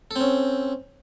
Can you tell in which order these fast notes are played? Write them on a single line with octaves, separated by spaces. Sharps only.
A4 C4 C#4